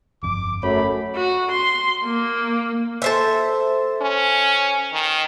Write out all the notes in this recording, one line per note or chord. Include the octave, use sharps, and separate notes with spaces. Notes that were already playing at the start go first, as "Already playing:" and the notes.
G1 F2 D6
F#2 A3 C#5 B5
F#4
C6
A#3
A4 C5 E5
C#4
D#3